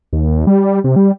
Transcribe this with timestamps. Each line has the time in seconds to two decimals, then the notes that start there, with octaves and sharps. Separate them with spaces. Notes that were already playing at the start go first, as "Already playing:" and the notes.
0.13 D#2
0.47 G3
0.84 C3
0.96 G3